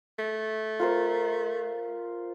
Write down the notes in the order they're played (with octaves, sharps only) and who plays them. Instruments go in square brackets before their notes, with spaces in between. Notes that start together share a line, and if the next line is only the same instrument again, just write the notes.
[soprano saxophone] A3
[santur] F4 A#4 C5